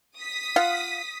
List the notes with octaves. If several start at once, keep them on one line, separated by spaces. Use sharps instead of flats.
D#6 B6
F4 F5 F#5